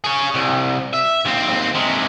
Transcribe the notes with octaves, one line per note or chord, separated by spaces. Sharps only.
G#4 C#5
C2
E5
D#2 C4
C3 G#3